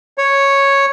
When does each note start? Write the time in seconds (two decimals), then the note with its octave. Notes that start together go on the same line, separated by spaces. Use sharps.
0.18 C#5